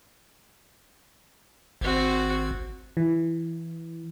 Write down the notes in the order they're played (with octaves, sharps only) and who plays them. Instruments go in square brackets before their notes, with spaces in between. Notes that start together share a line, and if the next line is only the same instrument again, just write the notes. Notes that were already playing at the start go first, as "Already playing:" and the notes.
[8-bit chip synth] G#1 [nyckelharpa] C4 F#4
[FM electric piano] E3